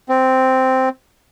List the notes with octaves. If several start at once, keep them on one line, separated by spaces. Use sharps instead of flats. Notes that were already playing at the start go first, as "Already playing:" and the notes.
C4